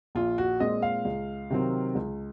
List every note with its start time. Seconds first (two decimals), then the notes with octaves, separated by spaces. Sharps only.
0.15 A#1 F4
0.38 F#4
0.60 A#2 G#3 C4 D#5
0.82 F5
1.05 C#2
1.50 C3 D#3 F#3 C4
1.95 C#2